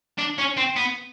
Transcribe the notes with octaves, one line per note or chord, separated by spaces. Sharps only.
D4
C#4
C4
B3